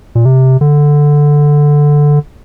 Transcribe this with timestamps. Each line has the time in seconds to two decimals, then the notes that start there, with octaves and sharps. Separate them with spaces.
0.15 A#2
0.25 C3
0.61 D3